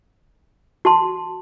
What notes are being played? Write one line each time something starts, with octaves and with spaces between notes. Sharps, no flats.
F#4 A5 C6